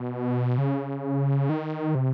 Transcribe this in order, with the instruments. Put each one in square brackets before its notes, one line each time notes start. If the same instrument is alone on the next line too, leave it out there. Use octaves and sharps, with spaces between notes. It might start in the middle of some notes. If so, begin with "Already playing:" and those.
Already playing: [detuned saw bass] B2
C#3
D#3
C3